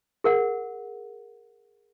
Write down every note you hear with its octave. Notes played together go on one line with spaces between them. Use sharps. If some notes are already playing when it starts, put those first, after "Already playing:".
G#4 A#4 F#5